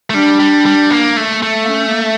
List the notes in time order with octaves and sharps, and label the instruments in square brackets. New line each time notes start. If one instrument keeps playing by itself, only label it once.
[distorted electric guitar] A3
[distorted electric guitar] G3 [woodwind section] D4
[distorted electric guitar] G3
G3
A#3
A3
A3
[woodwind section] A#3
C#4
C#4
A#3